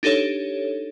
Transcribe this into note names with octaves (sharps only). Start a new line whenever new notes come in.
D4 D#4 G4 A4 C#5